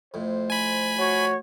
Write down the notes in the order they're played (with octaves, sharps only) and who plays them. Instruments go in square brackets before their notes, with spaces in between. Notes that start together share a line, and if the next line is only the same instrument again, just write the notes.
[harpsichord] F2 A2 [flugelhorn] C5
[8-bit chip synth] G#5 B5
[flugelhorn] F#4 [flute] C#5